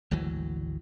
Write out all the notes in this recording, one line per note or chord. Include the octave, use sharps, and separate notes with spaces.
G#1 D2 E3 F#3